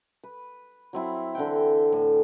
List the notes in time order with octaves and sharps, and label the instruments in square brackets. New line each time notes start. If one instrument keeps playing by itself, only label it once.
[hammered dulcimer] B4
F#3 C4 E4
D3 E3 F#5 G5
A2